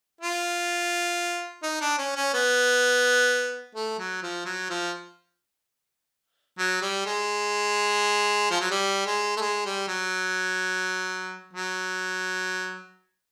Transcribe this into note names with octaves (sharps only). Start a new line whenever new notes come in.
F4
D#4
D4
C#4
C#4
B3
A3
F#3
F3
F#3
F3
F#3
G3
G#3
F3
F#3
G3
G#3
A3
G#3
G3
F#3
F#3